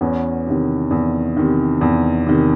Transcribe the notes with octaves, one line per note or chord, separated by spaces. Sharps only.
E2 B3 C#4
C3 D#3
E2
C3 D#3
E2
C3 D#3